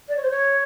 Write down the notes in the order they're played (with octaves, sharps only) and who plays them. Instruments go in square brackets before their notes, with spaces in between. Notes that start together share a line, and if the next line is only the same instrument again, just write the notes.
[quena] D5
C#5
C5
C#5